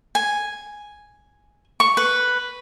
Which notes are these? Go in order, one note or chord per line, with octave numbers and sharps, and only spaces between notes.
G#5
C#6
B4